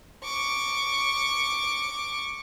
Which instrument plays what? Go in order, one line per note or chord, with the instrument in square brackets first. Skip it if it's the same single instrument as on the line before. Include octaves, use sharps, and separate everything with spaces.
[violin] C#6 D6